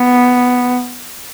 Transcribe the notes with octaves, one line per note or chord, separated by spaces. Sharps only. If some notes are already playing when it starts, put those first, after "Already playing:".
Already playing: B3